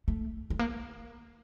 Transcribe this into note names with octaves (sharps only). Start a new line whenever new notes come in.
A3
A3
A#3